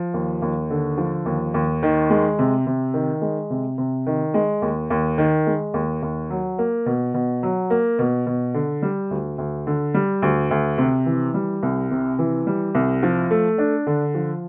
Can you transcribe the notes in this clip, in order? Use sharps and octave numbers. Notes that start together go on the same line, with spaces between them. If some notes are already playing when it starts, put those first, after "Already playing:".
Already playing: F3
D#2
D#2
D3
F3
D#2
D#2
D#3
G#3
C3
C3
D#3
G#3
C3
C3
D#3
G#3
D#2
D#2
D#3
G#3
D#2
D#2
F#3
A#3
B2
B2
F#3
A#3
B2
B2
D3
G3
D2
D2
D3
G3
D2
D2
C3
E3
G3
C2
C3
E3
G3
C2
F3
A3
D4
D3
F3